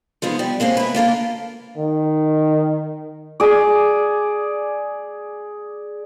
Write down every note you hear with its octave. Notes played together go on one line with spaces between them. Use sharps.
F3 G#3 B3 D#4
G3
G#3 A#3 C4 C#4
E4 B4
A#3 F4 A4 A#4
D#3
G#4 D5